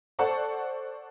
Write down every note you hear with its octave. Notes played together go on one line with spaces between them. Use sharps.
A4 C5 D5 F#5 A5 C#6